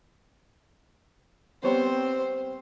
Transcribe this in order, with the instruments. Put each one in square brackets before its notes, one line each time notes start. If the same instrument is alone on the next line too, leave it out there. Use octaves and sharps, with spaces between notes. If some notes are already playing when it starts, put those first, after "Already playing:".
[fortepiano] G3 B3 C#5 [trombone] C4 [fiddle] C5